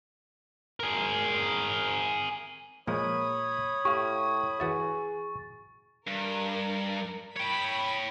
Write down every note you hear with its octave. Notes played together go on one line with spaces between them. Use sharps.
G#4 A#4
A#2 F3 G#3 C#5 B5 D#6
A2 G4 F5 C#6
E3 F#4 G#4 E5 A6
G2 A#4
C#5 G5 B5